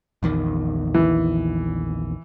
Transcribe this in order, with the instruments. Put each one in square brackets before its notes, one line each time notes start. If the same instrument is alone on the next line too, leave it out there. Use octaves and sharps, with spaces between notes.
[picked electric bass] A#1 E2 D#3
[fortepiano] E3